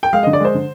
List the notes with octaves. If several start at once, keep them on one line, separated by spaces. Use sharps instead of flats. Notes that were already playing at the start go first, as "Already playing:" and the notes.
G5
G#3 F5
D3 D#5
D5
G#3 C5
D3